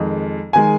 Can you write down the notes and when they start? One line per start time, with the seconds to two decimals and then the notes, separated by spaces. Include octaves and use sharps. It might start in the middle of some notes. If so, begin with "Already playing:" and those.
Already playing: F2 D#3 G#3
0.53 D#3 G#3 G#5